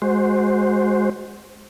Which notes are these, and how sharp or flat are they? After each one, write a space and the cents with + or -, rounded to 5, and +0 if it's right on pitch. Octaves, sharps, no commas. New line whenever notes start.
G#3 +0 F#4 +0 C5 +0